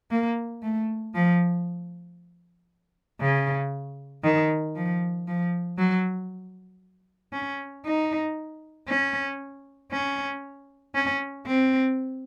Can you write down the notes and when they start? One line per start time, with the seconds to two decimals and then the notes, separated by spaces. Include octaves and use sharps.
0.11 A#3
0.62 A3
1.14 F3
3.21 C#3
4.24 D#3
4.75 F3
5.27 F3
5.78 F#3
7.33 C#4
7.85 D#4
8.88 C#4
9.92 C#4
10.95 C#4
11.47 C4